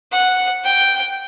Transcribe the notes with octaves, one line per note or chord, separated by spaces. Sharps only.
F#5
G5